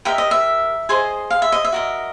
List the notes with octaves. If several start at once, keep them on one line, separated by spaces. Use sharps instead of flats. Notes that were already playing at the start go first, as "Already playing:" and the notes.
G4 A#4 D#5 E5
D#5
E5
G#4 C5 D#5
F5
E5
D#5
E5
F#4 A#4 D#5